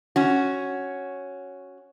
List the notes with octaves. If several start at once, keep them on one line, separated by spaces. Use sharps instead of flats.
C#4 F#4